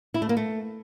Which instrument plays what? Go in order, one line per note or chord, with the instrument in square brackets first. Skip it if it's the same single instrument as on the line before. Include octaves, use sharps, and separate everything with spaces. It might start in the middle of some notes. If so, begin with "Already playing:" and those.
[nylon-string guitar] E4
A3
A#3
A3